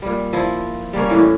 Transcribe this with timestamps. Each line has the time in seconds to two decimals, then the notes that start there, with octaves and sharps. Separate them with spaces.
0.02 A#2 G3
0.33 F3 E4
0.93 G3 A#3 C#4
1.10 A2 E3